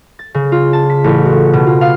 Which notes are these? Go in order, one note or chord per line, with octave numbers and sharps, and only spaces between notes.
A6
C#3
F4
A5
B6
A1
F#4
B2
F4
F5